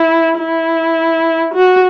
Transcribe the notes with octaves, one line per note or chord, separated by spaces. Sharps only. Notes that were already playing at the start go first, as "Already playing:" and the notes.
Already playing: E4
E4
F#4